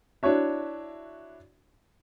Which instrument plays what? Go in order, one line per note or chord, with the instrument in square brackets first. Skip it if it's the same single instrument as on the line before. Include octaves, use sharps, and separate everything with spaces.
[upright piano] D4 E4 F#4 C#5 E5